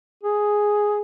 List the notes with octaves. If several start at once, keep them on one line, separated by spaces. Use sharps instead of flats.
G#4